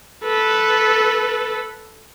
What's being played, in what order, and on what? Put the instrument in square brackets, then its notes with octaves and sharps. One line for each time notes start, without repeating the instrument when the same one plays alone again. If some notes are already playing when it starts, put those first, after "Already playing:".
[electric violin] A4 B4